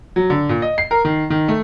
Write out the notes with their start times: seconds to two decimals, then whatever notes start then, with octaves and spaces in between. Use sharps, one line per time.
0.16 F#3
0.30 D3
0.49 A#2
0.62 D#5
0.78 C7
0.91 A#4
1.05 D#3
1.30 D#3
1.48 A3